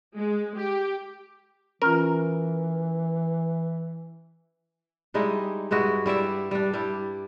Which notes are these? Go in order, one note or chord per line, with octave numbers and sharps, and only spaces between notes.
G#3
G4
E3 C#4 F4 A#4
G3 G#3 D#4 E4
G2 G#3 E4 F#4
G3 E4 D5 E5
G3 D4
G3 E4